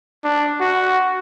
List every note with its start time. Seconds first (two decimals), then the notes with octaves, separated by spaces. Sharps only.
0.25 D4
0.61 F#4